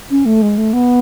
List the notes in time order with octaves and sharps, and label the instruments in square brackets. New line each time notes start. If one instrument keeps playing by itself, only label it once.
[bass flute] C#4
A3
G#3
A3
B3